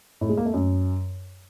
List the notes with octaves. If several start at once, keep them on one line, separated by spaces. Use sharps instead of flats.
A2
G#3
A#3
A3
F#2